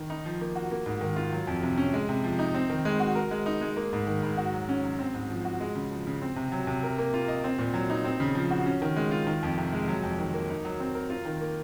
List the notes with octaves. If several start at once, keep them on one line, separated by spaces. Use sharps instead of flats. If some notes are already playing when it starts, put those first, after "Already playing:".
Already playing: D#3
D#4
F3
A#3
F#4
A#3
G#2
D#3
F4
F#3
F2
C3
C#4
G#3
C3
F3
D#4
C4
D#3
G#3
F#4
A#4
G#3
D#4
G#3
A#3
G#2
D#3
G#2
F#4
F#3
C#4
F#3
C4
G#2
F3
F#4
G#3
C#3
F3
C#3
C4
C3
F#3
C3
A#4
A#3
F4
D#5
C4
A#2
F#3
D#4
C4
C#3
F3
F#4
C#4
D#3
G#3
F4
D#3
F2
C3
G#3
F#3
F2
D#3
A#3
D#4
F#3
C4
A#4
F4
D#3
A#3